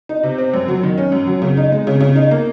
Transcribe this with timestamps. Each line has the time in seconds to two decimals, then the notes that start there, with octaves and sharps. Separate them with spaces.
0.09 D#4
0.23 C3
0.38 C4
0.54 F#2
0.68 F#3
0.83 D#3
0.98 C#4
1.12 F#2
1.27 F#3
1.42 C#3
1.57 D#4
1.72 G#3
1.87 C#3
2.01 C#3
2.16 D#4
2.31 A#3